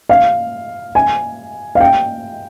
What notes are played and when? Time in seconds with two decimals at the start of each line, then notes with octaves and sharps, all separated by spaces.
0.09 F5
0.95 G#5
1.75 F5
1.80 G5